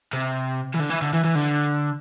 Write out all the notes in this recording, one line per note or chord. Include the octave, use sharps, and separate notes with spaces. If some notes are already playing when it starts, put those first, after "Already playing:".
C3
E3
D3
E3
D3
E3
E3
D3